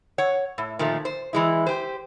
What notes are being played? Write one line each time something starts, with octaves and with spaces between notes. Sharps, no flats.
C#5 F#5
A2
A#2 D#3 F3 A3
C5
E3 G#3 E4
G4 C5